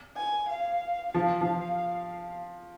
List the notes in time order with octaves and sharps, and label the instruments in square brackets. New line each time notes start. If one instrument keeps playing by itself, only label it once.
[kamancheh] G#5
F5
[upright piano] F3 [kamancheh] F5
[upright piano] F3